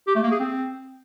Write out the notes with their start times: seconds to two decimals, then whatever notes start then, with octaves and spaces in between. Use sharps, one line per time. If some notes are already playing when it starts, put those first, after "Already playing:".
0.07 G4
0.15 A3
0.23 A#3
0.32 G#4
0.40 C4